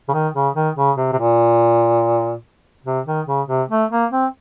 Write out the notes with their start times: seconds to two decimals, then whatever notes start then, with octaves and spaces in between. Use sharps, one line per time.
0.09 C#3
0.13 D#3
0.35 C#3
0.55 D#3
0.77 C#3
0.97 C3
1.13 C3
1.18 A#2
2.85 C3
3.06 D#3
3.27 C#3
3.48 C3
3.70 A3
3.91 A#3
4.11 C4